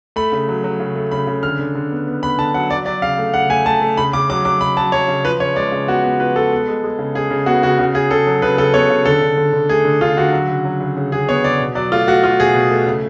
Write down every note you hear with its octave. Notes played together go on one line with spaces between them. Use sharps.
A3 B5
C#3
F#3
F#3
C#3
A3
C#3 B5
C#3
D3 F6
D3
D3
B3
B3
B3 B5
D3 A5
F#3 F#5
F#3 D5
F#3 D5
C#3 F5
A3
C#3 F#5
A3 G#5
A3 A5
A3
C#3 B5
C#3 D6
F#3 D6
F#3 D6
C#3 B5
F#3 A5
F#3 C#5
C#3
F3 B4
C#3 C#5
G#3 D5
C#3
B3 F#4
B3
F3 B4
G#3 A4
B3
G#3
G#3
C#3
C#3 G#4
C#3
B3 F#4
C#3 F#4
C#3 F#4
C#3 G#4
C#3 A4
F#3
C#3 B4
C#3 A4
B3 C#5
C#3
D3 A4
D3
D3
D3
A3 G#4
D3
D3 F4
D3 F#4
F#3
C#3
F#3
C#3
C#3
C#3 G#4
B3 C#5
C#3 D5
B2
F#3 D5
A3 F4
A3 F#4
A3 F4
B2 G#4
B2
A3
C#3